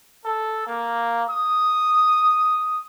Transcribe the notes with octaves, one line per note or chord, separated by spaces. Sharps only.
A4
A#3
D#6